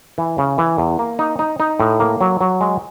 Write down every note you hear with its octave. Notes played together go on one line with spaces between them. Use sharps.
E3
C#3
E3
E2
A#3
D#4
D#4
D#4
A2
A#3
F#3
F#3
G#3